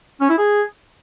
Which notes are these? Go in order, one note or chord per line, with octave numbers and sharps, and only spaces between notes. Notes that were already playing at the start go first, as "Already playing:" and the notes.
C#4
E4
G#4